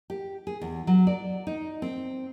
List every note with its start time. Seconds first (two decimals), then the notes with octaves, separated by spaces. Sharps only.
0.10 G4
0.47 G#4
0.62 E2
0.87 F#3
1.07 D5
1.47 D#4
1.82 C4